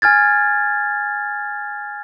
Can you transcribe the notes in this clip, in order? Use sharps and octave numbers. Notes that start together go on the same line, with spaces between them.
G#5 F6 G#6 A6